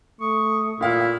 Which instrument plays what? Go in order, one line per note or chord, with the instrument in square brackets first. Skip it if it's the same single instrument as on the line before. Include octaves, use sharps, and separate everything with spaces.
[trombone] A3 [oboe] C#6 [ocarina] D#6
[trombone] A#2 [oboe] E4 [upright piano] F4 F5 F6